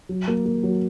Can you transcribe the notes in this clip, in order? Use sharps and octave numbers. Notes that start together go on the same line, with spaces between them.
F#3
A#3
A#3
F#3